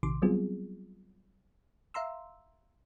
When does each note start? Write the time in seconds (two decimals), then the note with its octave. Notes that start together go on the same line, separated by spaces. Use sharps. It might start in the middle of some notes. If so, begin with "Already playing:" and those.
0.03 A#1 C3 D#3 C6 D6
0.22 F#3 G3 B3 C4 F4 G#4
1.94 E5 F5 A#5 C6 E6